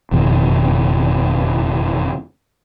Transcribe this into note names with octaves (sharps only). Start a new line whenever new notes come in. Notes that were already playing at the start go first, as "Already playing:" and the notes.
F#1 F2 B2 D#3